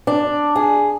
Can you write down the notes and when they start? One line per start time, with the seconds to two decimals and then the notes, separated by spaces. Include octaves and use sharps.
0.07 D4
0.56 G#4